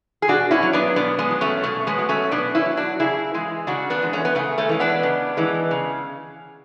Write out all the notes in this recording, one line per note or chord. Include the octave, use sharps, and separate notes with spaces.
G#4
B2 D4 F#4
C#4 E4
F#3
B3 D4
B2 B3 D4
G#3 B3
F#3
A3 C#4
B2 A3
G#3 B3
F#3
A3 C#4
B2 B3 D4
C#4 E4
F#3
D4 F#4
C#3 E4 G#4
E3 G#3
C#3 D4 F#4
B3 D4
E3 G#3
A3 C#4
B3
C#3 A3
A3 C#4
E3 G#3
B3 D4
C#3
E3 G#3
C#3